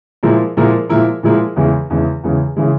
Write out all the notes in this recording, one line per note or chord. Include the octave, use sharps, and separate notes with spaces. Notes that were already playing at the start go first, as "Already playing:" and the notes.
A#2 F3 G#3 E4 A#4
A#2 F3 G#3 E4 A#4
A#2 F3 G#3 E4 A#4
A#2 F3 G#3 E4 A#4
E2 C#3 E3 G#3
E2 C#3 E3 G#3
E2 C#3 E3 G#3
C#3 E3 G#3